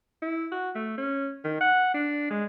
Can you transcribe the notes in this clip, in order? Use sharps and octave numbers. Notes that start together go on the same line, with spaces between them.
E4
F#4
A3
C#4
D#3
F#5
D4
G#3